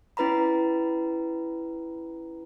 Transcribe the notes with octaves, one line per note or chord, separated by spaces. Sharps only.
C#4 E4 B4 A#5 B5